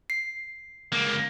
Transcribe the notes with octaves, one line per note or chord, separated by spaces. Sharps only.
C7
C#2 A#3